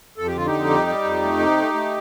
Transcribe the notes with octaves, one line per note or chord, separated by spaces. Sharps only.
F2 A4
G4
D3 F4
D#4 G4
F2
G3
G3
F2
A3
C3
A3
A3